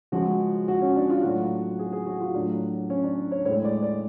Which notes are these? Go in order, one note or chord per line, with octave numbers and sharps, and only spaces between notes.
C#3 F3 G#3 F#4
F#4
C#4
D4
F4
A2 F#3 F#4
G#4
G#4
F#4
F4
A2 F#3 D4
C#4
D4
C#5
A2 G#3 C#5
D5
D5